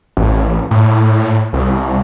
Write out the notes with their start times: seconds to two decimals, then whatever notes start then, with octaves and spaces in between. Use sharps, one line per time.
0.17 A1
0.71 A2
1.53 C2